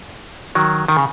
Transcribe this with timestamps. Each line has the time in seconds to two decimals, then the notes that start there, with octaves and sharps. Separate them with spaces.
0.55 D#3 F#3
0.88 D#3
0.97 C#3